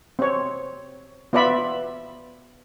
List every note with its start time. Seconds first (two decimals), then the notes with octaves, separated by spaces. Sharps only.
0.19 C4 C#5
1.33 B3 F4 D5 E5 B5